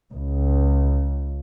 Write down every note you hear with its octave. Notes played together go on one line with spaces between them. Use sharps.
C#2